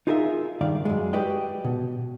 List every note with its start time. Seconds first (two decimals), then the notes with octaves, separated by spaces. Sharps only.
0.07 D#4 F4 G#4 A#4 C5 E5
0.61 C#2 G2 D#3 D5 F5
0.85 F#2 G#3
1.13 F#4 G4 B4 D5 D#5 G5
1.65 B2